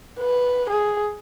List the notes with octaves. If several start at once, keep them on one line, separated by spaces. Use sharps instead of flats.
B4
G#4